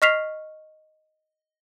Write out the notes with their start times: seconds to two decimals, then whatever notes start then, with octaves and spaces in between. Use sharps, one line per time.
0.02 D#5 C#6 F6 B6 C7 F7